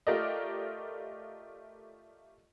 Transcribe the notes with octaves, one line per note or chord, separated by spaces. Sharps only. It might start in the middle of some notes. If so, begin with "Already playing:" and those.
A3 F4 G4 A#4 D5 D#5